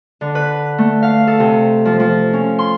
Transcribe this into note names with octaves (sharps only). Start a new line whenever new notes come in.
D3
B4
A3
F5
A4
C3
F3
F3
C#4
C6